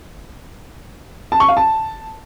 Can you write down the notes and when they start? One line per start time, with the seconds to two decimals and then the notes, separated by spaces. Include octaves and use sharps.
1.32 A5
1.40 C#6
1.48 F5
1.57 A5